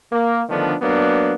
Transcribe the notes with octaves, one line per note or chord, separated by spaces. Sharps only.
A#3
D3 D#3 F3 A3 B3 D4
F#3 A#3 B3 D4